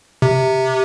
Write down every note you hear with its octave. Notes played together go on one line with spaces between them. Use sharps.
C3